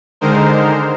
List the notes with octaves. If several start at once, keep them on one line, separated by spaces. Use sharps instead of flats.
D3 D#3 G#3 D#4 A#4 C5